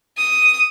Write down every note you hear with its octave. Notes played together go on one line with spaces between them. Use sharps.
D#6